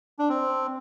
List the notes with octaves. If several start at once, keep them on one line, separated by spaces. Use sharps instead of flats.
D4
C4